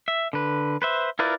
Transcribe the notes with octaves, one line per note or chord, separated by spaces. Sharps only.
E5
D3 B4
B4 C5 E5
E4 F4 A#4 B4 D5